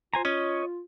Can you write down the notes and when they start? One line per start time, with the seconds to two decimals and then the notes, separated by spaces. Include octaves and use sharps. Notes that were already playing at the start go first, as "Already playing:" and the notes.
0.14 F4 C5 G#5 A#5
0.25 C#4 C#5 D#5